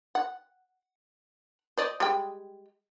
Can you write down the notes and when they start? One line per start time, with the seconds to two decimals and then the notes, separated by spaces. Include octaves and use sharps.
0.15 F#5
1.77 C5 D5 D#5
2.00 G3 G#3 G5